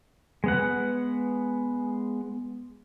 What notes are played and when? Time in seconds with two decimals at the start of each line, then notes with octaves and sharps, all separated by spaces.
0.44 G#3 B3 F#5